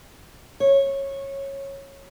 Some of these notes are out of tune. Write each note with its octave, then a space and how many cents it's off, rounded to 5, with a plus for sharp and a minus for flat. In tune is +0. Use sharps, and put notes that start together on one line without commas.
C#5 -15